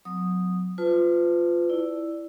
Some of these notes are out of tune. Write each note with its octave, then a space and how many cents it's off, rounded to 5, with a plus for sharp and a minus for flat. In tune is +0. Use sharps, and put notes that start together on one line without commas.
F#3 -20 C4 -35 D#6 -5
F4 +0 B4 +40 A5 +0
E4 +0 D5 +0